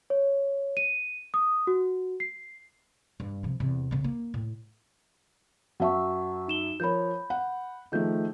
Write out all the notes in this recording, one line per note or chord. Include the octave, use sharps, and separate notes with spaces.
C#5
D#7
D#6
F#4
C7
G2
C3 F3
E2 C3
C#3 B3
A#3
A2
F#2 F#3 E5 F#5 A5 C#6
D#4 E7 G7
F3 A#4 C#5 B5 G6
F#5
D#3 F3 A3 G#4 G6